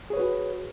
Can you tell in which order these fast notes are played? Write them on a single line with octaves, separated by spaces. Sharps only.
G#4 C#5 B4 F#4